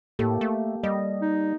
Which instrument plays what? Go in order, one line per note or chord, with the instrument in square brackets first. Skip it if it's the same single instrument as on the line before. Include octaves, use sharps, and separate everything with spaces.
[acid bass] A2 [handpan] A#3 G4 A4
[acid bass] A3
[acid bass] G3 [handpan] D#5
[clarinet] D#4